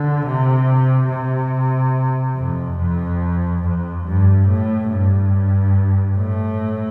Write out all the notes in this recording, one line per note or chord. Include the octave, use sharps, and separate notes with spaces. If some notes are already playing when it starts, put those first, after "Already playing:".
Already playing: D3
C3
C3
F2
F2
F2
G2
A2
G2
A2